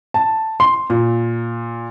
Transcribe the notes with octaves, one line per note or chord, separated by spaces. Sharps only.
A5
C6
A#2